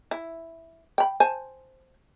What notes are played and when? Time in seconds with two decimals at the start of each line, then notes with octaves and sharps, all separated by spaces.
0.11 E4
0.98 G5 B5
1.20 C5 G#5 A5